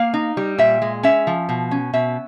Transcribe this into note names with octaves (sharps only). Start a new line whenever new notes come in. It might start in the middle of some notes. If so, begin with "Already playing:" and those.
Already playing: A#3 F5
D#4
G3
A#2 E5
G#3
C#4 E5
F3
B2
C#4
B2 E5